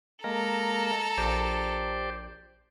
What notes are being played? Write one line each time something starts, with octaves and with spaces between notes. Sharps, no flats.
G#3 A#3 A4 A#4 A#5
A#1 G4 C5 D5